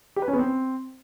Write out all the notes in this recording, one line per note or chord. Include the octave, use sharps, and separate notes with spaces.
G4
B4
C#4
B3
C4